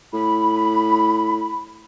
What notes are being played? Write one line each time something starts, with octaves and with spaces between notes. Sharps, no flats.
A2 B5